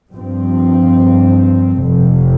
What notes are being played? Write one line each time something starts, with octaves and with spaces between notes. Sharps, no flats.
G2 F3 C4
F1 F2 C3